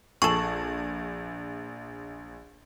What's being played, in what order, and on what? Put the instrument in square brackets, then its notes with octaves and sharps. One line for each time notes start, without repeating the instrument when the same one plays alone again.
[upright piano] A#1 [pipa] G#4 A4 [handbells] C#6